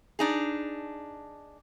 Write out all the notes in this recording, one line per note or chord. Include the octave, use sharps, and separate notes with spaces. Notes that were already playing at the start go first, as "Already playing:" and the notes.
D4 D#4 G#4